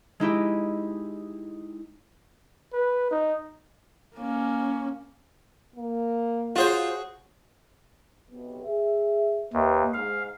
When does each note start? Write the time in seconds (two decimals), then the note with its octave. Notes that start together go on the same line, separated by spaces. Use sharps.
0.20 G#3 D#4 E4 G4
2.73 B4
3.11 D#4
4.17 A#3 C#4
5.76 A#3
6.56 F4 F#4 G#4 C5 C#5
8.30 B1 C3 B3
8.64 G#4 E5
9.53 D#2 B4 E5
9.94 G#2 F5